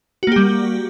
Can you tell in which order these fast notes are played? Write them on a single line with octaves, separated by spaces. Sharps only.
F#4 A#3 G4 G3